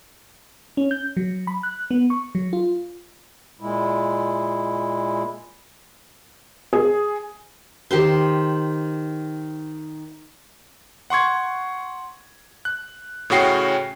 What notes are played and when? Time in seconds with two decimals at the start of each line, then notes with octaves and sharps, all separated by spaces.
0.77 C#4
0.91 G6
1.17 F#3
1.47 B5
1.63 F#6
1.91 B3
2.10 C#6
2.35 F#3
2.53 F4
3.61 A#2 G#3 E4
6.73 G#4
7.91 D#3 G4 C5 C6
11.10 F#5 C6 C#6 G#6
12.65 F#6
13.30 A2 C#3 C#4 F#4 G5 C7